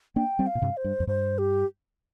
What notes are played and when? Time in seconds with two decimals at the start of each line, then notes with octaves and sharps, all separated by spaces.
0.16 A#3 D4 G5
0.39 G3 C4
0.47 F5
0.55 A#2
0.62 G2 C3
0.77 C5
0.84 G2
1.00 F2
1.07 G2 C5
1.38 G4